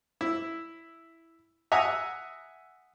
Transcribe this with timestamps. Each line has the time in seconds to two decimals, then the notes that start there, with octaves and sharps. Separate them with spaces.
0.21 E4
1.72 E5 F#5 G#5 A#5 D#6